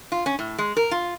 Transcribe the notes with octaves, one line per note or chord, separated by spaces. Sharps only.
F4
C#4
A2
G#3
A#4
F4